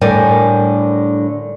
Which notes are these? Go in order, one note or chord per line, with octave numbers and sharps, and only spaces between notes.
A2 D3 G3 A#4 D5 G#5